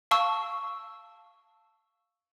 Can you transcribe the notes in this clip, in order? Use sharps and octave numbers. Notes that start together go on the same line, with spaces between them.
F5 A5 C#6 E6